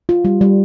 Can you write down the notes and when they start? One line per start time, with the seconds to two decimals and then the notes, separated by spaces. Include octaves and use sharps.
0.09 F4
0.25 G3
0.41 G3